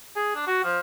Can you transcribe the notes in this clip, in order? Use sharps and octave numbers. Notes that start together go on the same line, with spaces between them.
G#4
D4
F#4
F3